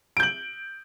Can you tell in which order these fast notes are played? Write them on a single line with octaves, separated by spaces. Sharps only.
D7 G6 F#7